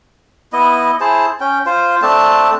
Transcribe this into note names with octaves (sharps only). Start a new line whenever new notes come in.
B3 E4 D#5
E4 G#4 C5 A5
C#4 G5
F4 C5
A3 C4 D4 A5